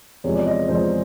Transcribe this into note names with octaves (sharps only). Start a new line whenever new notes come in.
E2 C3 F3 G#3 C#5
D5
D#5
C#5
E2 C3 F3 G#3 C5